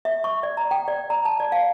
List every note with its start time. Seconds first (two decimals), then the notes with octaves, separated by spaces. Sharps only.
0.05 E5
0.24 C#6
0.43 D5
0.57 A#5
0.71 G5
0.88 D5
1.10 A#5
1.25 A5
1.40 D5
1.52 F5